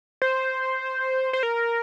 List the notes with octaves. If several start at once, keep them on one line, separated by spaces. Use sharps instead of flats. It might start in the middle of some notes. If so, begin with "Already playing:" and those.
C5
C5
A#4